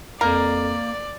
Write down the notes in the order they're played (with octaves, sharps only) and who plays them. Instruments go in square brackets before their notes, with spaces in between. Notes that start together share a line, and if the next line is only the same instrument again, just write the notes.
[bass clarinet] F2 [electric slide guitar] A#3 F5 [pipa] A#4 [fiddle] D5